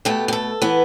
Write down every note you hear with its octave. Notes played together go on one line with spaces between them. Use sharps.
B2 A3 G4
G4
A4
E3 B3